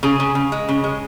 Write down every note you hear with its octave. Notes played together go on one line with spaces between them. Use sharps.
C#3 G#4
C#3
C#3
G#3
C#3
G#3